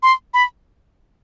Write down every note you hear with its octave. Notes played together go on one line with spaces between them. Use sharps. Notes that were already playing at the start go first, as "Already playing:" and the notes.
C6
B5